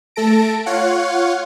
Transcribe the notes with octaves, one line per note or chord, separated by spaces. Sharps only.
A3 A4 A5 A#6 D7
F4 C#5 F5 F#5